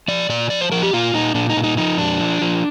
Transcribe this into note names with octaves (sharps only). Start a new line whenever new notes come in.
F3 D5
A#2 D5
F3 D5
C5
F3 A#4
G4
A#2 F4
A#2 D#4
A#2 D4
D#4
A#2
D#4
F3 D#4
F2 D4
F3
F3